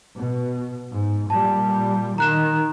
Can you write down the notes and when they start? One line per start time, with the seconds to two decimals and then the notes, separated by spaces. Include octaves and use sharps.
0.18 B2
0.92 G#2
1.30 A#2 G3 A5
2.18 D#3 A#5 F#6 E7